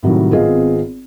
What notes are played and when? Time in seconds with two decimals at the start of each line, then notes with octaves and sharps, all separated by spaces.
0.03 A2 C3 D#3 F#3 G3
0.32 G#1 B3 C4 F4 G#4 D#5